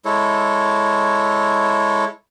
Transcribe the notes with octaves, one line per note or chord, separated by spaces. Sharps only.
G#3 E4 A4 C#5